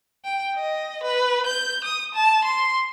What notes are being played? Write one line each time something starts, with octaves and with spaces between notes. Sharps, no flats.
G5
D#5
B4
G6
D#6
A5
C6